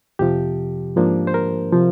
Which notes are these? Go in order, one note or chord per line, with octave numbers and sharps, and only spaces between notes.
F2 C3 F3 G4
G#2 F3 A#3 D4
C5
A#4
C3 F3